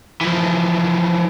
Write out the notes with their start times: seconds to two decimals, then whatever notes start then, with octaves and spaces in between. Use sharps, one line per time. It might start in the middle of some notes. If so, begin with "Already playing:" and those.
0.21 E3 F3